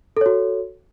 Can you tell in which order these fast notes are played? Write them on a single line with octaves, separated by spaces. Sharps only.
A4 C#5 F#4